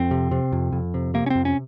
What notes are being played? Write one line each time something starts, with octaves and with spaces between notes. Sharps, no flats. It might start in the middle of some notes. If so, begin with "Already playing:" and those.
Already playing: F2 C4
C3
C3
F2
F2
C3
C3 A#3
C#4
F2 C4
C#4